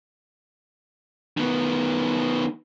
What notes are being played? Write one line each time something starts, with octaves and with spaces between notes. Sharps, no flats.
D#3 B3